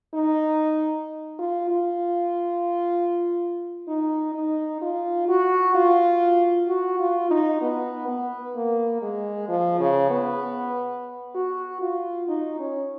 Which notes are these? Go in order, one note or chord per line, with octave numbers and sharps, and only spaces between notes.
D#4
F4
F4
D#4
D#4
F4
F#4
F4
F#4
F4
D#4
B3
B3
A#3
G#3
F3
C#3
B3
F#4
F4
D#4
C#4